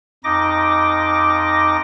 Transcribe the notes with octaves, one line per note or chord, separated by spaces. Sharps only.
F2 D#4 D#5 D6 A#6